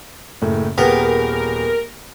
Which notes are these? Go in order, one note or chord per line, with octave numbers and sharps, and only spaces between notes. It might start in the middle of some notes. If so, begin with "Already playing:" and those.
F#1 A2
D#1 B3 G#4 A#4 G5